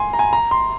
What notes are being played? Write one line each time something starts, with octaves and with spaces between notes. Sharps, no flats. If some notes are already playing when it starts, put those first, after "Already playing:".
Already playing: G#5 C6
A#5
G#5
A#5
C6